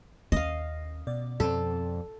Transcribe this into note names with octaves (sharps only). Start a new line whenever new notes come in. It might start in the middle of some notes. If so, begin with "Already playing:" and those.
D#2 C#4 D#5 F5
B2 D5
F2 C4 A4